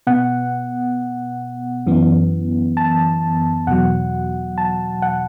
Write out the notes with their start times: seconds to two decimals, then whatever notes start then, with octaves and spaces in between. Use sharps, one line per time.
0.07 B2 B3 F#5
1.86 F#2 E3 B3
2.77 A5
3.67 E2 B2 F#3 F#5
4.58 A5
5.02 F#5